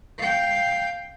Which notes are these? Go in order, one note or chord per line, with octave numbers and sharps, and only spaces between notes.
F5 G5